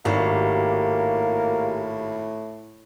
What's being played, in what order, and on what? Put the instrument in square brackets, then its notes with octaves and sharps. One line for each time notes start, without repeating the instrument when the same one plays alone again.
[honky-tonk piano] G#1 [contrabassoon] A2 [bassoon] A#3 [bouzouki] F#4 G4 F5